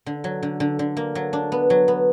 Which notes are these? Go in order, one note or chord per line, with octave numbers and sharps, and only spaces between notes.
D3
F#3
D3
D3
D3
A#3
F#3
D4
B3
F#3
B3